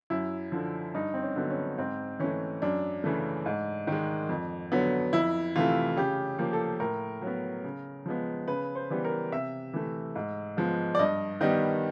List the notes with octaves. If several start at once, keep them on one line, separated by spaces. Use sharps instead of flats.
F#2 E4
D3 F3
G2 D#4
C4
C#4
D3 F#3 B3
C#4
G#2 C4
E3 A3 C#4
F#2 D4
C#3 E3 A3
G#2
D#3
G#3
F2
D3 F#3 B3
F2 E4
C3 E3 A3 F4
C#3 G4
F3 A#3
A4
A2 A#4
F#3 B3
C#3
F3 G#3 B3
C#3 B4
C5
E3 G3 B3
A#4
C3 E5
E3 A3
G#2
F3 G#3 B3
D5
G2 D#5
D#3 G3 B3 D#5